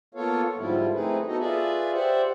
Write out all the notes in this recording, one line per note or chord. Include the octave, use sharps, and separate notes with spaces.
A#3 B3 F4 A4 C#5 F5
G#2 D3 F3 G3 E4 F4
A3 C4 D#4 E4 G#4 B4
B3 D#4 F#4 A4 D#5
F4 G#4 B4 D5 E5
G4 C5 D5 E5 F#5